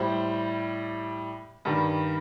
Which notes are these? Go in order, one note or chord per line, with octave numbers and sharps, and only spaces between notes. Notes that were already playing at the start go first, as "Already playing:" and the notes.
Already playing: A2 G3 C5
G2 D#3 G3